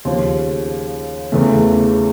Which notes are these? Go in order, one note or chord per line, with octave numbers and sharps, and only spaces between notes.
D#2 C#3 F3
E2 C#3 E3 A3